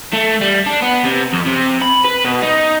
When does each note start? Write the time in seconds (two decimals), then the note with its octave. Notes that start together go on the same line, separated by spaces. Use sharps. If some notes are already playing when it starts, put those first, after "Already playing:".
0.13 A3
0.41 G3
0.66 D4
0.82 B3
1.04 C3
1.33 F2
1.46 C3
1.81 B5
2.04 B4
2.25 B2
2.42 D#4